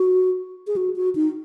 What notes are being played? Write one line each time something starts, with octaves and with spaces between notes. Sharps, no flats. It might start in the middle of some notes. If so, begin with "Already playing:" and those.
Already playing: F#4
G#4
F#4
F#4
D#4